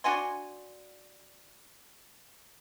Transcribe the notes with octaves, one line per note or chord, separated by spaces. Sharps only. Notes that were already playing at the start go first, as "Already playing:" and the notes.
D4 F#4 G#5 C6